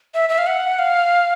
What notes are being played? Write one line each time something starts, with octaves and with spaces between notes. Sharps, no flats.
E5
E5
F5
F#5
F5